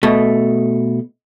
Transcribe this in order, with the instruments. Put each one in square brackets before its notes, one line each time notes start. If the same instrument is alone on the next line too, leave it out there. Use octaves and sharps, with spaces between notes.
[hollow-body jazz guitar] B2 A3